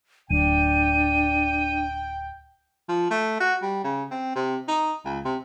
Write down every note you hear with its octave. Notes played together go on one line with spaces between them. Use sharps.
D1 D4 G5 D#7
F3
A3
F#4
G3
C#3
C4
C3
D#4
C#2
C3